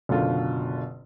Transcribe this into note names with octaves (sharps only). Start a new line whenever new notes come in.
F#1 B2 D3 F4